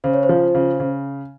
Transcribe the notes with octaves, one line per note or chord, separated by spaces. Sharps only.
C#3 C5
C#5
C5
F3
C#3
C#3